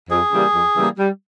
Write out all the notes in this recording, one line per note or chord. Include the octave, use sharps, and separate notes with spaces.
F2 G#4
C#3 E3 G3 A#3
F2
C#3 E3 G3 A#3
G3